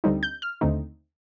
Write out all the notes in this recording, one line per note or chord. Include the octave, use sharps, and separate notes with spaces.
D2 D3 G3 C4 D#4
G6
F6
D#2 D3 A3 C4 D#4